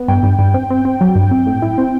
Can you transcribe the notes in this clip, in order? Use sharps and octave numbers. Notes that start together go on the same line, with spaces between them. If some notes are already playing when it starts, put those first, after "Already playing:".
Already playing: B3
G2 G5
G2
G2
C4
C4
C4
F#3
G2
C4
A2
E4
C4